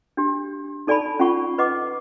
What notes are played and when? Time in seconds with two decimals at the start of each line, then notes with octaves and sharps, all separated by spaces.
0.17 D4 G4
0.87 D#4 A4 D5 G#5 A5 B5
1.19 C#4 F4 F#5 C#6
1.58 B4 D#5 F#5 D6